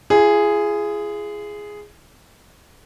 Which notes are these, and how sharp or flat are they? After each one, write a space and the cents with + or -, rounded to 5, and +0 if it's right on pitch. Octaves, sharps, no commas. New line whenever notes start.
F4 -45 G#4 +0